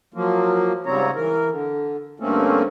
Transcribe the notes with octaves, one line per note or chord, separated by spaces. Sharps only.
F3 F#3 A#3
G#2 C#3 G3 C4 C#5 A#5
E3 A#4
D3
G2 D3 A3 A#3 C4 C#4